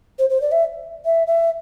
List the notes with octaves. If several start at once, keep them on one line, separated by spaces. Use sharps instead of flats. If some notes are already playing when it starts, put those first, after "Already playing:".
C5
C5
D5
E5
E5
E5